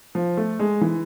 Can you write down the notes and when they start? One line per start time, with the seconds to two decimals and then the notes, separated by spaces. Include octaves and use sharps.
0.15 F3
0.37 A3
0.59 G#3
0.81 E3